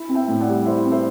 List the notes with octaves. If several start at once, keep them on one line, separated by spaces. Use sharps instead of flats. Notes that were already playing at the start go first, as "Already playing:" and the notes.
Already playing: E4
C4
E5 G5
A2
D5 F#5
G3
D5
E4 C5 E5
C4
C5 E5